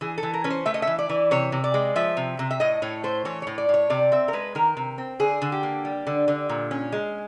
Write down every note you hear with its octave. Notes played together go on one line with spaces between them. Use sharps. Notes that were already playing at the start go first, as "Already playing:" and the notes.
E3 G#4
A4
E3
A#4
C#4 B4
C5
A3 E5
D#5
E5
E3
D5
E3
C3 C#5
C3
D5
G#3
F3 E5
C3
C3
E5
A2 D#5
A2 C#5
A3 C5
E3 C#5
A2 C#5
D5
A2 C#5
C3 D5
C4 E5
A#4
G#3 B4
D#3 A#4
C3
C4
D3 G#4
D3
G4
A#3
G3
D3
D3
A#2
C#4
G#3